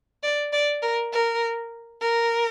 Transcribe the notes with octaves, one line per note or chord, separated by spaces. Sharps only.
D5
D5
A#4
A#4
A#4